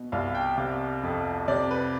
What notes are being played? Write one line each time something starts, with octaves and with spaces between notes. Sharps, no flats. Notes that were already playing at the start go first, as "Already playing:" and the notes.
Already playing: B2
C2 F5
G5
C3 F5
F2
C3 D5
B4